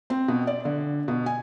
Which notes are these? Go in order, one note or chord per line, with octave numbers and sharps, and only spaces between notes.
C4
B2
D5
D3
B2
G#5